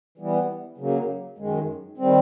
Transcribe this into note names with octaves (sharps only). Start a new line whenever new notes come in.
E3 G3 B3
C#3 F#3 A#3
F#2 D#3 G#3
D#3 G3 C4